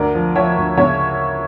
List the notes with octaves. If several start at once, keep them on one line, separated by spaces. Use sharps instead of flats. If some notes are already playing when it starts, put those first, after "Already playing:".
Already playing: D2 A#4 D5
F3
F3 C#5 E5
D2
C#3 C#5 E5